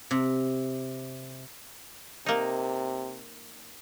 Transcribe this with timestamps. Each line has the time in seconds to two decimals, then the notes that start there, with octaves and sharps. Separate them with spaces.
0.11 C3
2.26 C3 A#3 D#4